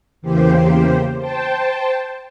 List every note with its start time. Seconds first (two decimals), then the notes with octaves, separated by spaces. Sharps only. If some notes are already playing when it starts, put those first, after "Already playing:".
0.22 E2 C#3 E3 A#3 G4 C5
1.17 C5 G5 A5